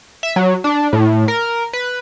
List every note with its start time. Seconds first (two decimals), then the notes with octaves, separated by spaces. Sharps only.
0.23 E5
0.36 F#3
0.64 D4
0.93 A2
1.28 A#4
1.73 B4